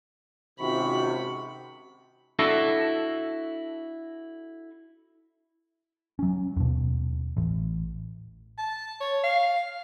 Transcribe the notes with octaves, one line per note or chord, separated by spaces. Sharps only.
G#2 C3 D#3 C#4 F4 F#4 B5 C#6
D4 E4 F#4 A4 A5
F#3 C#4
D#2 B2
A1
A5
C#5
F5